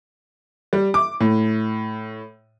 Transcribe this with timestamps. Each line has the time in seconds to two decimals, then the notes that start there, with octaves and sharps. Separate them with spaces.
0.73 G3
0.94 D6
1.20 A2